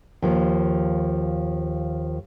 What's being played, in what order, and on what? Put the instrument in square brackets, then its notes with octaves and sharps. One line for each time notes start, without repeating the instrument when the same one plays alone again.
[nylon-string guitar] D#2 F3